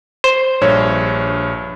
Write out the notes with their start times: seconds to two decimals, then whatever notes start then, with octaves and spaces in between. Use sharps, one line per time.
0.24 C5
0.61 A#1 G2 C#5